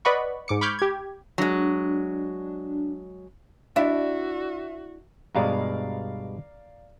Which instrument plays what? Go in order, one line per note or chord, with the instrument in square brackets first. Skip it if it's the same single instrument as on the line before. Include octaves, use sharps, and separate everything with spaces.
[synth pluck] B4 D5 D#5 F#5 B5 C#6
G#2 D6 C#7
B5 C#6 D6 F6 G6 G#6
G4 G#6
[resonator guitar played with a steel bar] F#3 G#3 [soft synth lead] D4
[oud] D4 E4 [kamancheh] F#4 [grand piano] E5
[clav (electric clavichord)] G2 B2 G#3 [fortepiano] D5 F5 A#5